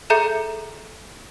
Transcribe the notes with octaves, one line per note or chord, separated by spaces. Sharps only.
G#4 A4 E5 A#5 G6 C#7